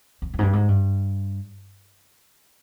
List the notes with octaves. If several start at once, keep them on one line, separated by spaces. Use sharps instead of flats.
F2
F2
G#2
G2
G#2
G2